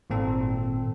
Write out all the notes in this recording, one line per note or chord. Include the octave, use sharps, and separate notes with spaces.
G#1 A#2 C4 A4